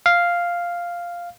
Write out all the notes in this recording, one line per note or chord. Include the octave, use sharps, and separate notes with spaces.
F5